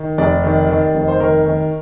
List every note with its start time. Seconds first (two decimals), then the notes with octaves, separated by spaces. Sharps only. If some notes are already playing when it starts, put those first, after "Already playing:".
Already playing: D#3
0.18 F1 D5
0.43 D#3
0.69 D#3
0.95 F1
1.08 C5
1.20 D#3 A#4
1.46 D#3